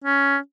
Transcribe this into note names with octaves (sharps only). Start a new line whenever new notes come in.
C#4